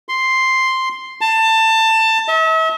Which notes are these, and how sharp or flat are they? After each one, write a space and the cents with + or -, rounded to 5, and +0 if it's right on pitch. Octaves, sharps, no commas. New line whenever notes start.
C6 +0
A5 +20
E5 -40